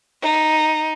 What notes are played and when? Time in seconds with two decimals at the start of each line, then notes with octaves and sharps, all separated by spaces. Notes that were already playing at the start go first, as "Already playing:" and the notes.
0.22 D#4